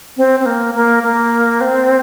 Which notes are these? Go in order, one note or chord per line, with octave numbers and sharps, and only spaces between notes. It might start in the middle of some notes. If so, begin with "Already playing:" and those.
C4
C4
A#3
A#3
A#3
C4